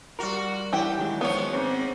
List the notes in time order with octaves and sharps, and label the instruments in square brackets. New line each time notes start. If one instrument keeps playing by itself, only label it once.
[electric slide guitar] G3 A#4 [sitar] F4 F#4
[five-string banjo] E3 F#5 G5 [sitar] G4
[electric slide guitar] D#3 F#3 G#3
[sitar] F3 A4 C#5 [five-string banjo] B3
[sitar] G#2 [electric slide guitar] C4 C#4